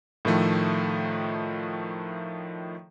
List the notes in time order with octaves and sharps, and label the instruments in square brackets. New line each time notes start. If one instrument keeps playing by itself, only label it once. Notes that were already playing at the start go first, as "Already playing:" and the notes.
[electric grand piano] A2 D#3 F3 A3